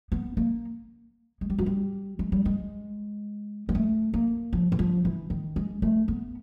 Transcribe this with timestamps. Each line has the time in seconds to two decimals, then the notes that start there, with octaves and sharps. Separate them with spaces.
0.12 B3
0.37 A#3
1.41 G#3
1.50 G3
1.59 F#3
1.66 G3
2.19 G#3
2.32 G3
2.46 G#3
3.69 G#3
3.75 A3
4.14 A#3
4.53 F3
4.72 E3
4.79 F3
5.05 E3
5.30 D#3
5.56 G#3
5.82 A3
6.08 B3